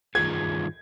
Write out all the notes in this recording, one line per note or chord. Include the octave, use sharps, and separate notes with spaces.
G2 D#3 A#3 F4 G#4 G#6